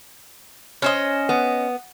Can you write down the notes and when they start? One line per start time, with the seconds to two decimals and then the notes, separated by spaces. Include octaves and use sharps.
0.82 C#4 C5 D#5
1.29 B3